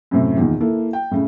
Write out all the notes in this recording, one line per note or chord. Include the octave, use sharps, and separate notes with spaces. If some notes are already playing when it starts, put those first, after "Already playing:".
F#2 A2 C3
E2 A#2 D#3
A#3 E4 A4
G5
A2 C#3